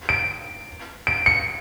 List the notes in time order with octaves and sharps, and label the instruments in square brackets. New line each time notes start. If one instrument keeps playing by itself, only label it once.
[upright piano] D7
D7
C#7